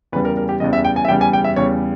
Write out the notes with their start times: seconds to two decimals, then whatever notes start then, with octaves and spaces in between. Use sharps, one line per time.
0.12 E2 C#3 G3 B4
0.25 A#4
0.37 A#4
0.49 G4
0.60 E2 C#3 G3 D#5
0.73 E5
0.85 G5
0.96 G#5
1.05 E5
1.08 E2 C#3 G3 G5
1.21 G#5
1.33 G5
1.44 E5
1.56 E2 C#3 G3 C#5